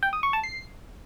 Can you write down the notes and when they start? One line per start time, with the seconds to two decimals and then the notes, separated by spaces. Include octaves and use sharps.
0.03 G5
0.13 D#6
0.23 C#6
0.33 A5
0.44 C7